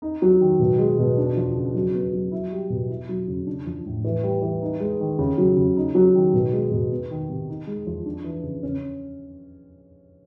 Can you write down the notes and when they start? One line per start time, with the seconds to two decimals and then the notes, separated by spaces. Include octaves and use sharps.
0.02 D#4
0.22 F#3
0.41 D#3
0.59 B2
0.79 G#3
0.99 B2
1.18 D4
1.36 F3
1.56 C#3
1.74 F#3
1.94 B3
2.13 F#3
2.32 E4
2.52 G3
2.70 B2
2.89 E4
3.09 F#3
3.28 C#3
3.47 D4
3.66 F3
3.86 A2
4.04 E3
4.23 G3
4.42 E3
4.62 D#4
4.80 G#3
5.00 D#3
5.19 C#3
5.38 F#3
5.57 C#3
5.77 D#4
5.95 F#3
6.15 D#3
6.34 B2
6.53 G#3
6.71 B2
6.91 B3
7.11 D#3
7.30 C3
7.49 D#4
7.67 G#3
7.87 F3
8.06 D4
8.24 E3
8.43 C#3
8.63 C#4